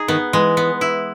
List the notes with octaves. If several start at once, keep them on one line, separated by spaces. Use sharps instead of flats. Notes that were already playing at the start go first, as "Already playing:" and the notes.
Already playing: D#4 G#4
D#3 B3
E3 G#3
B3
E4